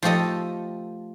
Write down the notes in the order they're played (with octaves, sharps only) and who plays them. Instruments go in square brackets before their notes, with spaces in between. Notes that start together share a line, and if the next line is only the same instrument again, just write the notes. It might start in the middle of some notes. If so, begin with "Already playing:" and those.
[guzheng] F3 A3 G4 A4 D#5